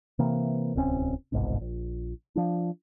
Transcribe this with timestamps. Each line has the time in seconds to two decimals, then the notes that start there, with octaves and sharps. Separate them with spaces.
0.19 C3 E3 A#3
0.75 D1 C2 C4 C#4
1.32 G1 C2 G#2 B2
1.61 A#1
2.35 F3 D4